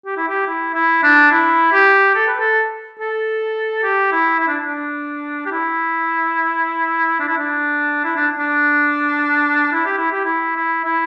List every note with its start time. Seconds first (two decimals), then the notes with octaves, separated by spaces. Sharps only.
0.06 G4
0.17 E4
0.28 G4
0.47 E4
0.75 E4
1.03 D4
1.31 E4
1.73 G4
2.15 A4
2.27 B4
2.40 A4
3.00 A4
3.84 G4
4.12 E4
4.39 E4
4.48 D4
4.65 D4
5.46 G4
5.51 E4
7.20 D4
7.29 E4
7.38 D4
8.04 E4
8.16 D4
8.39 D4
9.73 E4
9.86 G4
9.98 E4
10.12 G4
10.25 E4
10.56 E4
10.85 E4